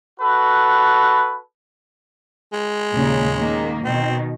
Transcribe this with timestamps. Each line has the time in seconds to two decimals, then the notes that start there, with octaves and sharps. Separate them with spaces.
0.20 F#4 A4 B4
2.53 G#3
2.94 D#2 A#2 C#3
3.37 D#3 A#3
3.84 B2 D#3 C4